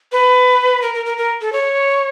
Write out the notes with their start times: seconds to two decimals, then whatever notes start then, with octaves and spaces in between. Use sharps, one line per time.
0.12 B4
0.82 A#4
0.94 A#4
1.06 A#4
1.17 A#4
1.41 A4
1.52 C#5